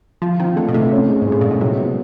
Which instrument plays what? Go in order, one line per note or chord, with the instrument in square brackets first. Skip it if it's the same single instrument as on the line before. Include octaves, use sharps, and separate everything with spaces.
[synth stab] F3 [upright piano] F4
[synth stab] D#3 [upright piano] C4
[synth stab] D3 [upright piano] A3
[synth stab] B2
[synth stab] C3 [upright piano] A3
[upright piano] C#4
G#3
[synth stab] G#2
[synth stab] A2 [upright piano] G#3
[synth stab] A#2 [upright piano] G#3
[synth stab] B2
[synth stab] C3 [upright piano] F#3
[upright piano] B3